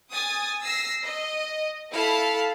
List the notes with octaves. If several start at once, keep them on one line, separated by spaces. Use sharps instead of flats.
G#5 D#6 A6
E6 A#6 C7
D#5
E4 A4 F5 A5 B5